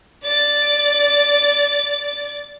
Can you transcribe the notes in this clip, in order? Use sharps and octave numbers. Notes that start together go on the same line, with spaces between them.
D5 A6